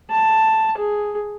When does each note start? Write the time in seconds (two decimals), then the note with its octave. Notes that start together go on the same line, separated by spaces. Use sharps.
0.11 A5
0.78 G#4